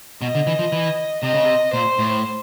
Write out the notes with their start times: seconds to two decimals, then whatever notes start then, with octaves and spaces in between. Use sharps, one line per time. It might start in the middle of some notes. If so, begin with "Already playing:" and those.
0.21 B2 D#5
0.35 D3
0.47 E3
0.59 F3
0.72 E3
1.23 C3 D#5
1.34 C#3
1.44 C3
1.73 A#2 C5
1.99 A2